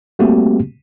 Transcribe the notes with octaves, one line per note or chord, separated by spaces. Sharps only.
G3 A3 A#3 C4 F#4 G4